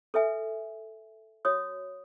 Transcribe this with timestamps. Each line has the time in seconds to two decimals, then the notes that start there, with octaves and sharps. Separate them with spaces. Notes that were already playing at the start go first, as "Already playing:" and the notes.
0.14 A4 B4 E5 G#5
1.45 F#4 C#5 D#6